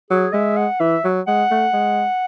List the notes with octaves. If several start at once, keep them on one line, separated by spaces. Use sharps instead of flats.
F#3 G#4
G#3 E5
F#5
E3 E5
F#3
G#3 F#5
A3
G#3